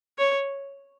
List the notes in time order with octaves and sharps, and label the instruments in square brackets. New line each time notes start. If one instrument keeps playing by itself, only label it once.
[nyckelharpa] C#5